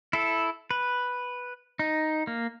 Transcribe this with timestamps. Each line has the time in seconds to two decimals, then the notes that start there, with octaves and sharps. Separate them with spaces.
0.13 E4 A4
0.71 B4
1.79 D#4
2.27 A#3